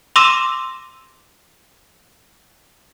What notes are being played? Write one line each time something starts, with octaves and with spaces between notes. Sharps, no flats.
C6 D6 E6 A#6 D#7 E7